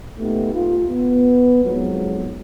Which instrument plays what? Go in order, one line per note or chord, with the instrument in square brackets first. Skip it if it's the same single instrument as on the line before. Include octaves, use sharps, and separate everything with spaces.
[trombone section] A#2 A3 B3 D#4 G4
F4
B3
F2 G#2 F3 F#3